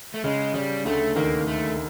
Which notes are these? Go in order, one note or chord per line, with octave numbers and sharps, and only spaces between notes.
A3
C#3 G#3
C#3 G3
D2 D3 A3
D#2 D#3 A#3
A3